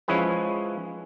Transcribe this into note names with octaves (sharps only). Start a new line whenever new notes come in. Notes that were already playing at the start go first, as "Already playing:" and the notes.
F3 G#3 C#4 E4 G#4 B4